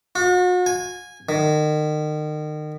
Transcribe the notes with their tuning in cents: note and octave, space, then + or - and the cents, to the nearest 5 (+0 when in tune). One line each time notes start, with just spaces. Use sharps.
F#4 -40
G#5 -15
D#3 -35